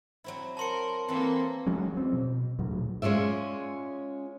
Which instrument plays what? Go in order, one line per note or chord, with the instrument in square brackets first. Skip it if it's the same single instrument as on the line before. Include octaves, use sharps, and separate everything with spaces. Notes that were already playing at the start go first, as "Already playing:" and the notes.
[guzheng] F#3 C4 E4
[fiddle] A#4 [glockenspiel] A5 C6 C#7
[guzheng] E3 E4 [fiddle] A#3 A4 [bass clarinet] C4
[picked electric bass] F3 F#3 G#3 C#4
F#3 C4
B2
D2 A#2 F#3
[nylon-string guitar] G#3 C#4 F4 D5 E5